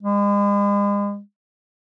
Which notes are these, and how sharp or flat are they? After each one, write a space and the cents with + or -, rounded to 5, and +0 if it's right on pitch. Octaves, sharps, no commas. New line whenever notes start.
G#3 -40